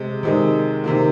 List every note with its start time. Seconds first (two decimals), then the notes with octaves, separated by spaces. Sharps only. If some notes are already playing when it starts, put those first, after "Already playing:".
Already playing: C3 G#3
0.23 C3 D#3 G#3
0.84 C3 D#3 A#3